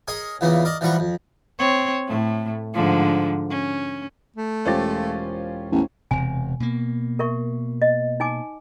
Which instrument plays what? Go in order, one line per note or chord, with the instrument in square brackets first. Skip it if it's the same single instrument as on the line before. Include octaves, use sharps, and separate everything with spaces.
[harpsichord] G#4 A#4 C#5 D#5 G#5
E2 A#2 C#3 E3 A#3 B3
A#4 D5 D#5
E3 F3 G3 A#4 F#5 C#6
F2
[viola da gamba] C4 C#5
A2 A3
G#2 D3 F3
C#4
[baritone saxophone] A3
[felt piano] E1 C5 A6 [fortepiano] C#4 F4 G4
[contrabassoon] A1 [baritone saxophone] E2
[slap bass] E1 C3 [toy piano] G#5
[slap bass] B2 A#3
[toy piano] A#4 E5 C#6
D#5
D#4 G#5 D6